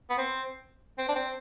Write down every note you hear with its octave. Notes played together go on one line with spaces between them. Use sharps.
B3
C4
C4
D4
C4